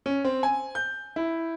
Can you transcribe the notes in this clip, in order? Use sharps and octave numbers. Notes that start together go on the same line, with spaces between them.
C#4
C4
G#5
G6
E4